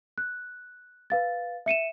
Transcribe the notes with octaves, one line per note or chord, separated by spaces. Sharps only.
F#6
B4 F5 A6
E5 C#7 D#7 E7